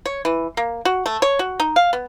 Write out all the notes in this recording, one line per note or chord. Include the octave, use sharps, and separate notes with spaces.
C#5
E3
A#3
F#4
A3
C#5
F#4
D#4
F5
B3